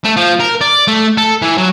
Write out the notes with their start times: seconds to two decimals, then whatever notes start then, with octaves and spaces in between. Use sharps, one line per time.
0.04 A3
0.16 F3
0.40 A#4
0.61 D5
0.88 A3
1.17 A4
1.42 E3
1.58 F#3